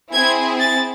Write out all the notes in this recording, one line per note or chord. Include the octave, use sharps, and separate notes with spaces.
C4 E4 G#4 G#6
A6